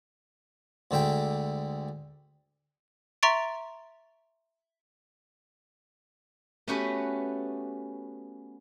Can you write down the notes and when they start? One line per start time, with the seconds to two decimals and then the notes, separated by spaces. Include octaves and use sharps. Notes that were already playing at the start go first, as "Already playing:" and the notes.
0.91 D2 D3 G#3 E5 G5
3.23 E5 A#5 C6 C#6 A6 D7
6.68 A3 B3 C#4 F#4 G4 B4